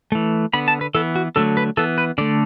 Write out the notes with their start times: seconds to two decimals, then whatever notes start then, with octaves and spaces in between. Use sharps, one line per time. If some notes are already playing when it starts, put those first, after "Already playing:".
0.12 E3 A3
0.54 D3 B3 B5
0.68 A5
0.81 B4
0.95 E3 B3 A4
1.16 F#4
1.36 D3 F#3 A3 A4
1.57 B4
1.77 E3 B3 A4
1.98 B4
2.18 D3 A3 D5